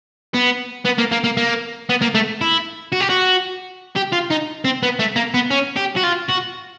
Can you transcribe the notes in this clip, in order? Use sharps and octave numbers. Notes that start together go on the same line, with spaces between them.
B3
B3
A#3
A#3
A#3
A#3
B3
A#3
A3
E4
F#4
G4
F#4
G4
F4
D#4
C4
B3
A3
A#3
B3
C#4
G4
F#4
F4
F#4